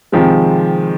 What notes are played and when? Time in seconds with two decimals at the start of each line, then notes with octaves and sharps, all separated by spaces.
0.12 C3 D#3 F3 G#3